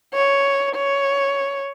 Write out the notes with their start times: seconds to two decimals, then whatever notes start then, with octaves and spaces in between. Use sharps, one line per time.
0.14 C#5
0.75 C#5